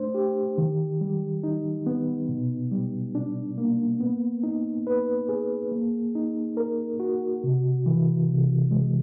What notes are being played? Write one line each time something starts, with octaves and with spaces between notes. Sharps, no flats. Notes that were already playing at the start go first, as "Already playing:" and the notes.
Already playing: A3 D4 C5
G4
D#3
G3
D#4
B3
B2
G3
D4
A#3
B3
D#4
B4
G#4
A#3
D#4
A#4
F#4
C3
E3
C3
G#3